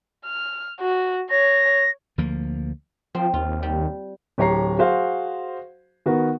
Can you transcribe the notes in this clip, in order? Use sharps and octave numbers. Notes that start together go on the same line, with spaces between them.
F6
F#4
C#5 A#6
D2 F3 A#3
F3 C4
D#2 F4
G3
D1 G4 C#5 A#5 C7
F#4 G#4 C5 F5
D#3 B3 F#4 A#4 B4